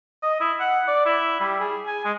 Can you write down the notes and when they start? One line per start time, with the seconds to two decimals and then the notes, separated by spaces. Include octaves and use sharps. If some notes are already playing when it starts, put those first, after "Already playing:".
0.23 D#5
0.40 E4
0.60 F#5
0.88 D5
1.06 E4
1.41 G3
1.60 G#4
1.87 G#5
2.05 G#3